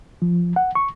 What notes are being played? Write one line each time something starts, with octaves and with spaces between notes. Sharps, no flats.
F3
F#5
C#6